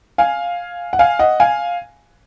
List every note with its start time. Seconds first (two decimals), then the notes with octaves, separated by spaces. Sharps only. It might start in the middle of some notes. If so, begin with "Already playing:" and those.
0.18 F5 G#5
0.93 F#5
0.99 F5 G#5
1.19 D#5 F#5
1.40 F5 G#5